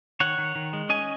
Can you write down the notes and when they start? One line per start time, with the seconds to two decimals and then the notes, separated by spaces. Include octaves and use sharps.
0.20 D#3 C#5 F#5
0.38 D#3
0.55 D#3
0.73 G#3
0.89 C#4 D#5 G#5